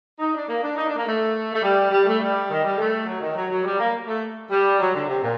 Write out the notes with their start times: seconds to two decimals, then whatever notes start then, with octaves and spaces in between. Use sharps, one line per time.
0.19 D#4
0.33 D4
0.48 A#3
0.62 D4
0.76 D#4
0.85 D4
0.95 A#3
1.05 A3
1.52 A3
1.62 G3
1.90 G3
2.05 A3
2.20 G3
2.48 D#3
2.63 G3
2.77 A3
3.05 F#3
3.20 D#3
3.34 F#3
3.48 F#3
3.63 G3
3.78 A#3
4.06 A3
4.50 G3
4.78 F#3
4.92 D3
5.07 C3
5.21 A#2